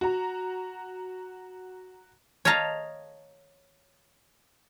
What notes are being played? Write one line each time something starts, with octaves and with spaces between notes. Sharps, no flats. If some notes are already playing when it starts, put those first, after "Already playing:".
F#4 A#5
C#5 D#5 F5 A5 A#5